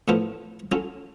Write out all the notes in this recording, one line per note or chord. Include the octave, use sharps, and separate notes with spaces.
A2 F3 B3 F4 A4
F#3 C#4 F4 A4